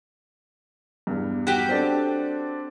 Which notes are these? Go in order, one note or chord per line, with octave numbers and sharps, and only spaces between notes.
E2 G2
F#4 G4
C4 D4 A4